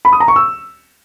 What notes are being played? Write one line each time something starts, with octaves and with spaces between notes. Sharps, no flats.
B5
D#6
A#5
C#6
E6